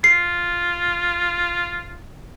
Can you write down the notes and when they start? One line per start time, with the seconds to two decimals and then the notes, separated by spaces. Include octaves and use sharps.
0.04 F4 C7